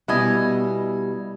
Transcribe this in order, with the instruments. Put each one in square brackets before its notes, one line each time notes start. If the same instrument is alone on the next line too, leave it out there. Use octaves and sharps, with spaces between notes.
[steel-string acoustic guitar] B2 G3 [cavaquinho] E4 D#5 G#5